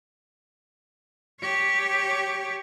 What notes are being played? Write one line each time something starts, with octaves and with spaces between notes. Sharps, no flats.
G4 C#5